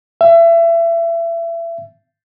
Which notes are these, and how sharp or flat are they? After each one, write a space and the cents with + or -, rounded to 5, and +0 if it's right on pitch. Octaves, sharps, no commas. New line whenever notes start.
E5 +30